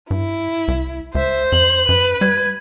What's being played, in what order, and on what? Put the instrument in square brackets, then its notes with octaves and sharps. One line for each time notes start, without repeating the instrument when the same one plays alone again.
[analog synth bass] G2 [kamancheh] E4
[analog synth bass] C2
[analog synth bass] C#2 [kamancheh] C5 [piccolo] E5
[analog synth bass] F2 [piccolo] F#7
[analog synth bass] F#2 [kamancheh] B4
[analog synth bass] G3 [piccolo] G#6